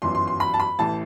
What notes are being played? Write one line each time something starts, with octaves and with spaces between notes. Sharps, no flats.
G1 F#2 E3 C6
C6
C6
B5
A5
B5
A1 A2 E3 A5